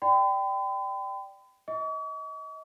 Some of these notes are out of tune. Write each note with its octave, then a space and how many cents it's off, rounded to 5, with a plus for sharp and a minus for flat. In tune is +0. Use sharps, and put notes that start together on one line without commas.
D5 +0 G5 -5 B5 +45
D#5 +30 C#6 +45